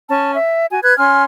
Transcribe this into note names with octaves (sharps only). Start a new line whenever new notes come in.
C#4 A5
E5
F#4 G#5
B4 F#6 G#6
C#4 G#5 C6 F6